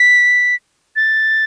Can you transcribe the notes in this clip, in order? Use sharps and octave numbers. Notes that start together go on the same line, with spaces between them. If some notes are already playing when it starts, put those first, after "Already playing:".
Already playing: B6
A6